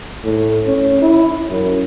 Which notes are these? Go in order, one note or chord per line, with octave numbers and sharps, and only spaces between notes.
A2
C#4
E4
F#2